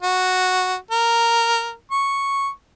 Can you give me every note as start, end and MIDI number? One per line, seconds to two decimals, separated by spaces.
0.03 0.75 66
0.91 1.72 70
1.91 2.49 85